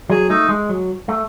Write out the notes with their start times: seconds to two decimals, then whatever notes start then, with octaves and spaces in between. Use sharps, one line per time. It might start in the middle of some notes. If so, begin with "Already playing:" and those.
0.09 F#3 G#4
0.29 A3 D#4
0.49 G#3
0.69 F#3
1.09 A3